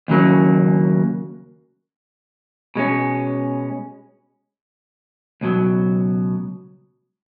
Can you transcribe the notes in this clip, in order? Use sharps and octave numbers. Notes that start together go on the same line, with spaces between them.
D#2 C#3 F#3 A#3
B2 G#3 C#4
C#2 B2 F#3